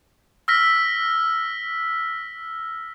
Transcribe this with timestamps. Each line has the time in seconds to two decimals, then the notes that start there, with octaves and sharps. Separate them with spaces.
0.48 E6 F6 A#6 B6